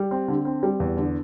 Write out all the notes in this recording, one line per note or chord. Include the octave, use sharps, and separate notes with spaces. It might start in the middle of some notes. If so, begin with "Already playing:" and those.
Already playing: G3
C4
D3
C4
G3
E2
D3